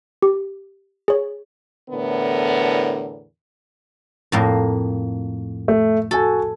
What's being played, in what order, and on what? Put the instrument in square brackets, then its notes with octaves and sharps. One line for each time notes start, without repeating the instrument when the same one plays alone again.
[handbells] G4
G#4 C#5
[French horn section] E2 A2 D3 B3 A#4
[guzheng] F2 A2 A#3
[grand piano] A3
[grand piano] F#4 G#5 [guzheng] A4